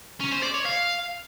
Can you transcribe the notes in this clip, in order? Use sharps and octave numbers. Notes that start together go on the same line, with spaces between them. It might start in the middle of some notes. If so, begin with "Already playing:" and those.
C#4
C5
D5
C#5
F5